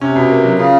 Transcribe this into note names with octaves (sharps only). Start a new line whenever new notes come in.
C3 C#4
B2
A#3
F#3
C#3 F4